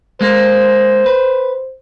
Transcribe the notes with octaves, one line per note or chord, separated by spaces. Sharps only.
G#3 A#3 C5
B4